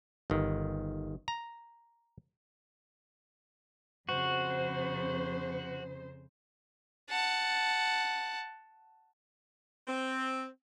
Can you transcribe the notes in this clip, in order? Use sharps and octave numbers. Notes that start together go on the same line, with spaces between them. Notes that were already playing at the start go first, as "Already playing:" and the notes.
G1 D#3
A#5
F2 C#3 F#4 C5
F#5 A5
C4